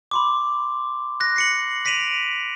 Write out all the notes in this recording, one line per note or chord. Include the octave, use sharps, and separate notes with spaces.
B5 C6 D6
F#6 A#6
C7 C#7 F#7
A#6 B6 D7 D#7 F7 F#7